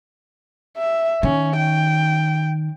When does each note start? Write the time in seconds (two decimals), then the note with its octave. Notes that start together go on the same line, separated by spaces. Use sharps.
0.77 E5
1.23 D#3 C#4
1.56 G5